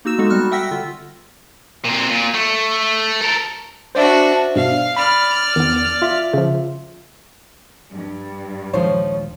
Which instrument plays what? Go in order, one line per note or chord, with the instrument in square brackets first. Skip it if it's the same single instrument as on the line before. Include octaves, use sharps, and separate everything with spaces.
[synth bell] A#3 D#4 F#4 E6 E7
G#3 B3 D#4 F#4 A4
G3 F#4 F6 F#6
E5 F#5 G5 E6 A#6 B6
D3 F4
[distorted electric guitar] A#2 C4
A#2
A3
A4 A#4
[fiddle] D4 F#4 [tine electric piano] C5 D5 E5
[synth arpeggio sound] G2 B2 [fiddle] F5
[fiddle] D5 F6 [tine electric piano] B5
[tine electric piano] E2 [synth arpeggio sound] D#3 B3
[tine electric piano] F4 E5
[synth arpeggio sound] C#3 F3
[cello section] G2
[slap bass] D#1 G#3 [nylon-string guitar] F3 D#4 C5 [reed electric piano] C#5